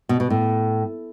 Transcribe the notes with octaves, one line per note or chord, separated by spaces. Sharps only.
B2
B2
A2